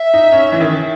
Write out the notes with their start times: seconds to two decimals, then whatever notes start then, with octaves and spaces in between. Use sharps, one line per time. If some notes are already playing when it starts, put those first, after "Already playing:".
Already playing: E5
0.14 D#4
0.32 C#4
0.52 E3
0.61 D#3